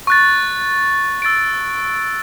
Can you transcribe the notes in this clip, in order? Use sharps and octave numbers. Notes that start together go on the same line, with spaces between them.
C#6 F#6 A6
E6 A6 D7